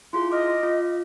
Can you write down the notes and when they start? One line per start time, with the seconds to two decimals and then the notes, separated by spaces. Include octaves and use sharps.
0.13 E4 F4 G#4 C6
0.32 D#5 D6 F6
0.63 F4